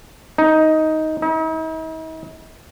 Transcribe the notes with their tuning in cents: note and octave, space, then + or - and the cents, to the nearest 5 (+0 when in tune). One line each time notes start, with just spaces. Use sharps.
D#4 +10
D#4 +45